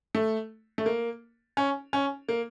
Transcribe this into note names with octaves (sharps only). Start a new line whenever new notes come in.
A3
A3
A#3
C#4
C#4
A#3